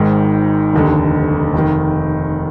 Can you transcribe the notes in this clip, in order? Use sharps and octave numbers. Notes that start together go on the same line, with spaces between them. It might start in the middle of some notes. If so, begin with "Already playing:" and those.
Already playing: G#1 G#2 D#3
F1 D#2 D3
F1 D#3